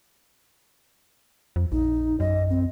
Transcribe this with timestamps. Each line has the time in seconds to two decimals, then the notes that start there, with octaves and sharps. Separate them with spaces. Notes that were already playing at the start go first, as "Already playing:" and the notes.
1.56 F2
1.72 A#1 D#4
2.20 F#2 D#5
2.50 C4